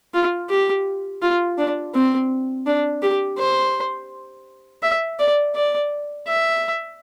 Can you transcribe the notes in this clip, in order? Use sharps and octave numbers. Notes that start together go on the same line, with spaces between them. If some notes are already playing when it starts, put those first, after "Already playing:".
F4
G4
F4
D4
C4
D4
G4
C5
E5
D5
D5
E5